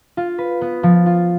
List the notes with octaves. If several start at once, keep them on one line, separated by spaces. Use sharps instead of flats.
F4
B4
B3
F3
F4